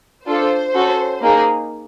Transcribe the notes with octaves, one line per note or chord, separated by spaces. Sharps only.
D4 F4 A4 C5
C#4 F#4 A4
A#3 D#4 G#4